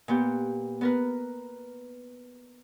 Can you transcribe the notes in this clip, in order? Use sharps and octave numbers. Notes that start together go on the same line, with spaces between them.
A#2 B3 G4
B3 A#4 B4